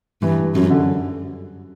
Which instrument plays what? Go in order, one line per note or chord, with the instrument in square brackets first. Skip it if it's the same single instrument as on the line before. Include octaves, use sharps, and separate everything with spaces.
[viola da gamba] G2 [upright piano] E3
[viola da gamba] F#2
[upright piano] D3